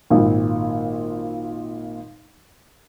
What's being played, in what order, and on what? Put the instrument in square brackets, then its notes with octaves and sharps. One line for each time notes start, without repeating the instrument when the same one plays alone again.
[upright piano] G#1 A#2